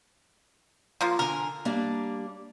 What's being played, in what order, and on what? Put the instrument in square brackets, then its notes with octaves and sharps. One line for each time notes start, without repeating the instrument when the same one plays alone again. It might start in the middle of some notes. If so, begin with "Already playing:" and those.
[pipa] F3 A#3 F4
[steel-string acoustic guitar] D3 G#5 [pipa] A#4
[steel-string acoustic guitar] G3 A#3 D4